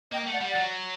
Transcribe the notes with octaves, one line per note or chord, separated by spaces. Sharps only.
A#3 D#5 G5
A3
D5 F#5
G3
D5 F#5
F#3